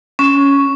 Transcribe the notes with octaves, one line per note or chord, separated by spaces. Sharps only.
C#4